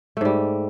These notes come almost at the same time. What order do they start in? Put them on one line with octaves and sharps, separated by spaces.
A3 G#2 G3